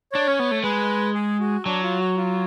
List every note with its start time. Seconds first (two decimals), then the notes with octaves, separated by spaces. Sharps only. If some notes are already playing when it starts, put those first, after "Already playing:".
0.12 D4 C#5
0.28 C#4
0.39 B3
0.51 A3
0.64 G#3 B4
1.14 G#4
1.40 F#4
1.65 F#3 D4
1.83 F4
2.00 F#4
2.17 F4